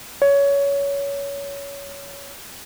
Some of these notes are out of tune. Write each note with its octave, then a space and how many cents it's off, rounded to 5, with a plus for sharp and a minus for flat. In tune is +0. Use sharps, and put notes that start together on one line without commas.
C#5 +20